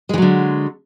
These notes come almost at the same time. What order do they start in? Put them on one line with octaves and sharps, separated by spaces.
G#3 E3 F#3 D3